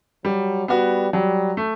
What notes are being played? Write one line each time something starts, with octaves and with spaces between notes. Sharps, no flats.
F#3 G3
G3 B3 F#4
F#3 G3
A3